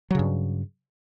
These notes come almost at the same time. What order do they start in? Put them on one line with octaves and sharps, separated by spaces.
F#3 C#3 G2